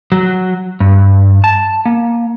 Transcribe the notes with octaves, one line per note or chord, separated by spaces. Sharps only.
F#3
G2
A5
A#3